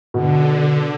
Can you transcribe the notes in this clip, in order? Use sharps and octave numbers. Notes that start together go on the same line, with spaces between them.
B2 D3